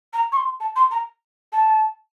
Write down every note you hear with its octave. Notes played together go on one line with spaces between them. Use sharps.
A#5
C#6
C6
A5
C6
A#5
A5